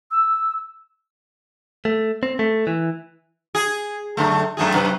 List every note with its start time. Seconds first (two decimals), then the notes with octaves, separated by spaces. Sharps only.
0.11 E6
1.85 A3
2.23 C4
2.39 A3
2.67 E3
3.55 G#4
4.17 F#2 D3 A3
4.57 F#2 A3 G#4
4.74 F#2 C3 B4